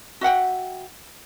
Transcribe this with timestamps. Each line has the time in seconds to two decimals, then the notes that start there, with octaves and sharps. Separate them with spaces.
0.21 F#4 E5 F#5 G5